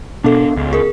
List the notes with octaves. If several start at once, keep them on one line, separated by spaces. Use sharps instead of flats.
B2 B3 D4 A4
C#2
G#4 A#4